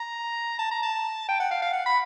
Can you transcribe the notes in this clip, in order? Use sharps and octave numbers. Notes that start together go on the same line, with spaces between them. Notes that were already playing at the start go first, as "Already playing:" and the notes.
Already playing: A#5
A5
A#5
A5
G5
F#5
F5
F5
F#5
B5